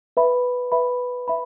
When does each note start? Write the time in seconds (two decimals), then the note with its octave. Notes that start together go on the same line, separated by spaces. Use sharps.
0.17 B4 E5 B5
0.72 B4 E5 B5
1.28 E5 B5